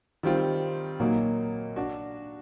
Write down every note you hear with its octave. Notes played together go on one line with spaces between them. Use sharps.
D#3 G3 C4 F4
A#2 F#3 A#3 D#4 F#4
D4 F#4